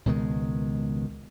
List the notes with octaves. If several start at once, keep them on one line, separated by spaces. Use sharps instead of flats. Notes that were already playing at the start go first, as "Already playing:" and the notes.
C#2 B2 D#3 G#3